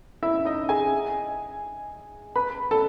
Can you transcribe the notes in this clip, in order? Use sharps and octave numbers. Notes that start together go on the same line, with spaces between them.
E4 E5
D#4 D#5
G#4 G#5
B4 B5
A4 A5